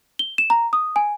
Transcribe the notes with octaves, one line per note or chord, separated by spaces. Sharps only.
G7
E7
A#5
D#6
G#5